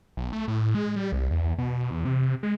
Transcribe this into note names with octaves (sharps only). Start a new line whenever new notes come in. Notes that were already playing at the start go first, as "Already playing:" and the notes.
B1
A3
A2
G#3
G3
C2
E2
B2
E2
C3
G#3